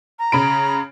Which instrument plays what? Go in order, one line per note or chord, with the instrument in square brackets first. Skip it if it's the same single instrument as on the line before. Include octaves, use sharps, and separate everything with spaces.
[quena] A#5
[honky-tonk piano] C#3 B5 D7